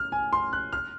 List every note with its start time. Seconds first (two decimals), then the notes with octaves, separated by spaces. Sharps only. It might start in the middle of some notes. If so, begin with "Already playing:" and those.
Already playing: F6
0.12 G#5
0.33 C6
0.53 F#6
0.73 F6